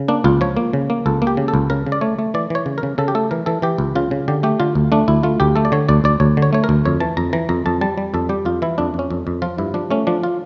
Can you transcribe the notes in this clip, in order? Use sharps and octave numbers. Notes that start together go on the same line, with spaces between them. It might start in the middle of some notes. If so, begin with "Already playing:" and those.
Already playing: C#3
A#3 D4
C#2 F4
F3 C#5
A#3
C#3
A#3
C#2 A4
A#3
G4
C#3
A4
C#2
C#3 A#4
C#3
D5
A3 C#5
A3
E3 D5
E3 C#5
C#3
A#4
C#3
C#3 A4
G4
A3 A4
E3 A#4
E3 A4
E3 G4
C#2
C#3 F4
C#3
D3 G4
A3 G4
D3 F4
D2
A3 D4
D2 E4
A3 F4
D2 G4
A3 A4
D5
D3 C#5
D2 D5
D2 D5
D2 C#5
D3
C#5
A3 C#5
A#4
D2
F2 C#5
E3 A5
F2 A#5
E3 A#5
F2 A#5
F2 A5
G3 A5
G3
F2 A4
G3 G4
F2 F4
E3 E4
F2 D4
F2
C#4
F2
F2
F3 F4
G2 E4
F3 D4
A3 C#4
F3 D4
F4